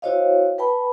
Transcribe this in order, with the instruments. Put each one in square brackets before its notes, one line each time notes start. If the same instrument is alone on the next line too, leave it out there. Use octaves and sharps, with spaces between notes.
[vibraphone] E4 F#4 C5 C#5 D#5 F5
B4 G5 A5 B5